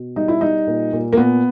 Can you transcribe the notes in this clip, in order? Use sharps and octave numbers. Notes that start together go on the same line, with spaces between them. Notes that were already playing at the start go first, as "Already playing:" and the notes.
Already playing: B2
G3 D#4
E4
G3 D#4
A#2
A#2
A#3
A#2 B3